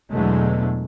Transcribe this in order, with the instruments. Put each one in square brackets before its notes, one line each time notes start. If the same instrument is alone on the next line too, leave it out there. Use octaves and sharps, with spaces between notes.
[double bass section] E2 B2 D3 F#3 G#3 A3